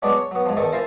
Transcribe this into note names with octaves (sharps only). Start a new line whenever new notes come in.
F#3 G#3 B3 D4 D5
C#5
F#3 B3
G#2 F3
E2 D#3 A4 G#5
E4 F4 A#4 C5 G#5 A5